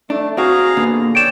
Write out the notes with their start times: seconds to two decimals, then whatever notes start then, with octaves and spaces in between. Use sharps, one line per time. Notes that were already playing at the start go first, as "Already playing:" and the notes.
0.10 A3 D4
0.37 C4 F#4 G#4 F5 A#5
0.77 A#2 D3 B3
1.15 C#5 D5 G5 D7 E7